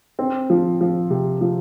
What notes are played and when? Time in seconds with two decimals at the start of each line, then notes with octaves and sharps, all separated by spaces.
0.19 C4
0.50 F3
0.81 F3
1.10 C3
1.41 F3